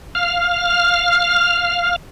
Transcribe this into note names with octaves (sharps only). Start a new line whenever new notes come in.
F5 F6